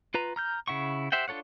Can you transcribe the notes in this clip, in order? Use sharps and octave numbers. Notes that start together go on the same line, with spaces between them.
F4 B4 A#5
A#5 F6 G6
C#3 E4 F#5 C#6
G4 C5 E5 F#5 G5
D4 F4 A4 C#5 F#5